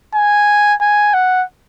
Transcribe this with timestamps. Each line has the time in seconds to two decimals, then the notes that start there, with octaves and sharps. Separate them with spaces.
0.15 G#5
0.82 G#5
1.14 F#5